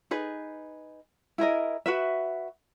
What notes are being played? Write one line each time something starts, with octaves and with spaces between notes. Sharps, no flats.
D#4 G#4 B4
E4 G#4 A#4 D#5
F#4 B4 E5